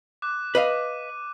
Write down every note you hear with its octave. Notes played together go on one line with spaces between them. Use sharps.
D6 F#6
B4 D#5 F5 D#7